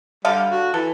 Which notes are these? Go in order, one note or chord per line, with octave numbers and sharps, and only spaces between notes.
D3 G3 A4 F5
F#4
E3 A4